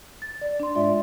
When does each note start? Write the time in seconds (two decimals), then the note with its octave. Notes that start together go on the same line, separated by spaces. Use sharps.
0.22 A6
0.41 D5
0.60 D4 C6
0.75 G#2 G#3 F4 D5 E5 C6